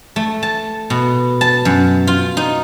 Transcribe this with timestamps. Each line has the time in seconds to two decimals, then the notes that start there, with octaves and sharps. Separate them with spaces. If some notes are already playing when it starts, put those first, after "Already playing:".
0.16 A3
0.43 A5
0.90 B2
1.41 A5
1.65 F#2
2.07 F4
2.37 D#4